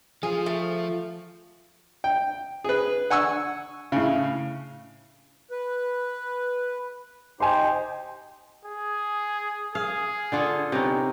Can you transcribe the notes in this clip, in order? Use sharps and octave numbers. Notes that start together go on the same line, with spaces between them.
F3 F4 G#4
A3
G5
G#4 B4
F#5 G#5 C#6 E6
A2 C#3
B4
D#4 G4 C5 G#5 C6
G#4
G#4 F5
D3 F4 A4
C3 B3 C#4 D#4